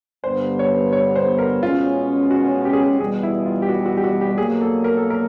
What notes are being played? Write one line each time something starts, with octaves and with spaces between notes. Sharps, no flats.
G2 D3 G3 B3 C5
C#5
C#5
C5
A#4
B2 G#3 C#4 F4
F#4
G4
G#4
G4
E2 B2 G3 G#4
E4
F4
G4
F#4
F#4
G4
F#4
G4
B2 F#3 A#3 G#4
A4
A#4
A4
A#4